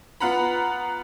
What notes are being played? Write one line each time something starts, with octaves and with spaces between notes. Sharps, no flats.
B3 F4 F#5 A#5 B5